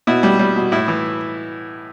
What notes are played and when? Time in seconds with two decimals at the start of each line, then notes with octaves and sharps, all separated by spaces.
0.07 B2 E4
0.23 G3
0.39 G3
0.56 B2
0.72 A2 E4
0.88 E3